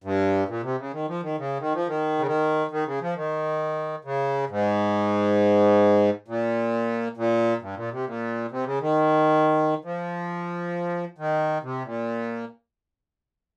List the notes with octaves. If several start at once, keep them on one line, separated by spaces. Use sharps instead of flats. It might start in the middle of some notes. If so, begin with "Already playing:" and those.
G2
A#2
C3
C#3
D#3
F3
D#3
C#3
D#3
F3
D#3
C#3
D#3
D#3
C#3
F3
D#3
C#3
G#2
A#2
A#2
G2
A#2
C3
A#2
C3
C#3
D#3
F3
D#3
C3
A#2